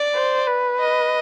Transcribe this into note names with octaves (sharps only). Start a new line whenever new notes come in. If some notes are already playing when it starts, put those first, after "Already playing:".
Already playing: D5
C5
B4
D#5